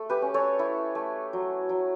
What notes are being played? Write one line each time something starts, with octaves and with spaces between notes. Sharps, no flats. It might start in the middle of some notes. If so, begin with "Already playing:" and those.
Already playing: A3 A4
G4 B4
C#4
A4 C#5
E4
A3
F#3
F#3